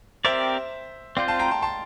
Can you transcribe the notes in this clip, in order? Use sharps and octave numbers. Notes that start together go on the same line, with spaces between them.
C4 G4 A#4 C5 D5 E5
C4 F4 C5 D5 F5
F5 A5
G5 A#5
A5 C6
A5 C6